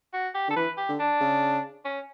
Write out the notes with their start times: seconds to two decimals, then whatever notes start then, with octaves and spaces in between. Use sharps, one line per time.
0.14 F#4
0.35 G4
0.48 D3 A4
0.56 E3 B4
0.77 G4
0.89 D3
0.99 D4
1.21 C#3
1.85 C#4